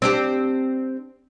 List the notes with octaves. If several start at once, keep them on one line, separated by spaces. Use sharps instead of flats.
C4 D4 G4